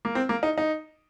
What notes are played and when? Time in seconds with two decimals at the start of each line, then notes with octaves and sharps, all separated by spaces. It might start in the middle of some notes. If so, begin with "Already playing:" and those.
0.05 A#3
0.15 C4
0.29 A#3
0.43 D#4
0.58 D#4